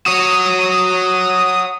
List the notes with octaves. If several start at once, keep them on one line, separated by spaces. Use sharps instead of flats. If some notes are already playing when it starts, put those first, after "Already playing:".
F#4 C#5 D#6